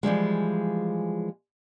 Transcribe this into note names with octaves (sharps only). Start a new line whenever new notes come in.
E3 F3 G3 G#3